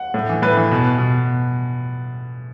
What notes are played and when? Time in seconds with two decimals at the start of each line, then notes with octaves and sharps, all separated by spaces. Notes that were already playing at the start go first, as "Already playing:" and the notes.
Already playing: F#5
0.14 A2
0.29 E3
0.42 A2 B4
0.57 E3
0.71 B2
0.98 B2